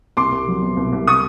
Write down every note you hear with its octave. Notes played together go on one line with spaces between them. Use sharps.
C2 C6 D6
C2
F#3
B2
C2
C2
C#6 D#6